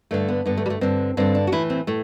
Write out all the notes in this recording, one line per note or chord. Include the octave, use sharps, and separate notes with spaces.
G2 D3 A3
B3
G2 D3 B3
A3
G3
A3
G2 D3 C4
G2 D3 C4
D4
F#4
A2 E3 E4
C4
A2 A3